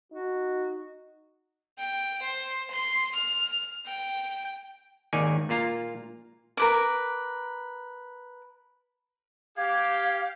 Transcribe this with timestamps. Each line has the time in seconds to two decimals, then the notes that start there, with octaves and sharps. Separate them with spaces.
0.12 D#4 F#4
1.78 G5
2.22 C5
2.70 C6
3.15 F6
3.85 G5
5.13 G#1 D#2 D#4 A#4 D5 G#5
5.49 A#2 A#3 F4 A#5
6.57 A#4 B4 D6
9.57 G4 F5 G#6